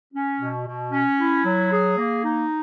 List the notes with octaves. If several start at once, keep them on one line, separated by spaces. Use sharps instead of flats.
C#4
B2
B2
C#4
E4
F#3
G#4
A#3
D#4